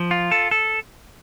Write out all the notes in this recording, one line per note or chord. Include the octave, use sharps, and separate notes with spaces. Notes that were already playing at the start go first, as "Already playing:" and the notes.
Already playing: F3
F4
A4
A4